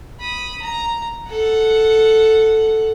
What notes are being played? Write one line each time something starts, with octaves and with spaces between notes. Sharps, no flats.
B5 D#6
A#5
A4 F#5